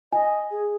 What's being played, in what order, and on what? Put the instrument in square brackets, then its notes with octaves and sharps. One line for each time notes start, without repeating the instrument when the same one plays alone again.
[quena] D#5 [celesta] G#5
[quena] G#4